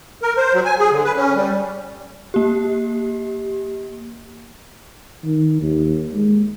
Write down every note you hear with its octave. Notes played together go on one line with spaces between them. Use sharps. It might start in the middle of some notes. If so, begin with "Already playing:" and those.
A#4
C5
F#3
G#5
G#4
D3
B4
C#4
G3
A#3 G4
D#3
D#2
G#3